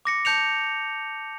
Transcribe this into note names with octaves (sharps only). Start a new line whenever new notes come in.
D6 A#6 C#7
A5 G6 C#7 F7